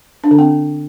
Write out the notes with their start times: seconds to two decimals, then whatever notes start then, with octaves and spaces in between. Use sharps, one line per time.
0.24 D4
0.31 D3
0.39 C4